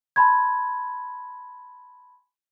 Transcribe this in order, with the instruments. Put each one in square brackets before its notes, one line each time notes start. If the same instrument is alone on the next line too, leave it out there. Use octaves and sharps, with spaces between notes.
[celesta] G#5 A5 B5 C6 G#6